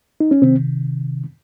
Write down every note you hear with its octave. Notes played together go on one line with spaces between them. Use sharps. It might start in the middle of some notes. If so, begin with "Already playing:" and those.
D#4
C#4
C3 D#3 C4